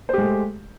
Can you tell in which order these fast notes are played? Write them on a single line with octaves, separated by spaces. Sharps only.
C5 G4 G#3 A3